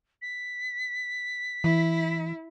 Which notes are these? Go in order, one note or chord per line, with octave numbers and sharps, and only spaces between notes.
B6
E3 E4